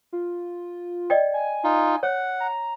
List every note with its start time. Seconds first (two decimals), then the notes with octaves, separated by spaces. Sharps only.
0.13 F4
1.10 D5 D#5 G5
1.34 G#5
1.64 D#4 F4
2.03 C#5 F#5
2.40 A#5